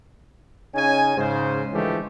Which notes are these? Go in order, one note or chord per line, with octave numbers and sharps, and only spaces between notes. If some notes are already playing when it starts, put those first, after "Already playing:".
C#3 C#4 D#4 G#5
G#2 C#3 C5
D3 E3 F3 G#3 A3 G4